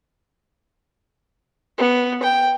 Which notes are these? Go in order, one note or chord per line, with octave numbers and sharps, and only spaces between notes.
B3
G5